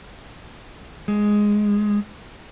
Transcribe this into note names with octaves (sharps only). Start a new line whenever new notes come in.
G#3